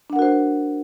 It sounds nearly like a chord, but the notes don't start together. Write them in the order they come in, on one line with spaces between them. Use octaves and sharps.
D4 F#5 A#4 F#4 C5